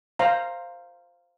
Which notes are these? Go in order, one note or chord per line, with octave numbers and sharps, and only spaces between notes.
C5 F5 A#5